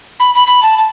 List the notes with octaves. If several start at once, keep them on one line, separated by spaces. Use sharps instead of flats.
B5
B5
B5
A5
A5